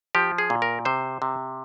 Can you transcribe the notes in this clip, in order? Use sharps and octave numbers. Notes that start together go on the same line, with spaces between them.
F3 G4
G#4
A#2
A#4
C3 C5
C3